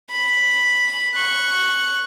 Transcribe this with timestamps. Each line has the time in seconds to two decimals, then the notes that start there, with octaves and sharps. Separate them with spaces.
0.11 B5
1.14 C#6 F#6